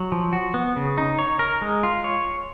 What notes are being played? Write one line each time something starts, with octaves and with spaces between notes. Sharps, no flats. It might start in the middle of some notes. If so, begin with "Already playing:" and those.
Already playing: F#3
F3
F#4
B3
C#3
D#4
C#5
A#4
G#3
F4
C#5